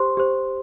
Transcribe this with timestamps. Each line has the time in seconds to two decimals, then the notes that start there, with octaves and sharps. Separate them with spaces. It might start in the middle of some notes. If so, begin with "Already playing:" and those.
Already playing: G4 C5 C6
0.17 G4 C5